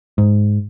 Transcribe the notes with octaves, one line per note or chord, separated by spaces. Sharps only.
G#2